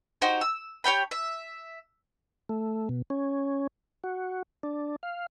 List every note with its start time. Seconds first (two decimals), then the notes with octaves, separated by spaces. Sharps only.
0.22 D#4 F#4 G4 C5
0.41 E6
0.84 G4 C#5 G5 B5
1.11 E5
2.49 A3
2.89 B2
3.10 C#4
4.04 F#4
4.63 D4
5.03 F5